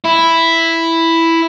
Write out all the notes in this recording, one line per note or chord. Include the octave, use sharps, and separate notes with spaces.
E4